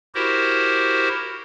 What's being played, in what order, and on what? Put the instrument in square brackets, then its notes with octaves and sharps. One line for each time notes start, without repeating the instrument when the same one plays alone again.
[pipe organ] E4 F#4 G4 A#4 C5